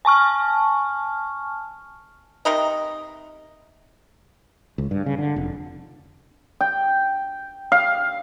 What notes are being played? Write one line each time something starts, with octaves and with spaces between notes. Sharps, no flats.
G#5 A5 C#6 F6
C3 D#4 A#4 D#5
C#2
G2
C#3
D3
F1
G5
F5